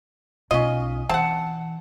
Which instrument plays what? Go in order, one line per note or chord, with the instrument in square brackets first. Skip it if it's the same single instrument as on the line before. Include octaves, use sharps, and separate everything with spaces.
[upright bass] B1 [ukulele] C#4 F4 [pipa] D#5
[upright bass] E3 [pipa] C4 [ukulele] F#5 A5